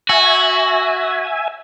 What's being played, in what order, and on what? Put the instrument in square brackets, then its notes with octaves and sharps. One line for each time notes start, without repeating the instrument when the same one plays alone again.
[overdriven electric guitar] F#4 [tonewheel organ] E5 G#5